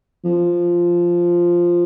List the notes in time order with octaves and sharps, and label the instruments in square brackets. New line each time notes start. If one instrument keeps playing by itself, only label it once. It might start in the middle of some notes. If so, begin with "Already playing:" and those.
[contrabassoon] F3